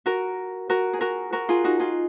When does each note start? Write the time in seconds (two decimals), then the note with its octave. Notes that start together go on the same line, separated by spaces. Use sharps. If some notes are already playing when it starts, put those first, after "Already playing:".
0.06 F#4 A#4
0.70 F#4 A#4
0.93 G#4
1.01 F#4 A#4
1.32 F#4 A#4
1.49 F4 G#4
1.64 D#4 F#4
1.80 F4 G#4